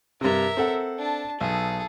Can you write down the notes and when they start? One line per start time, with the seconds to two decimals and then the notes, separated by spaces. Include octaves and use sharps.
0.21 G2 C3 A#4 E5
0.57 C4 A4 F#5
0.99 D4 A5
1.41 B1 G#4 A4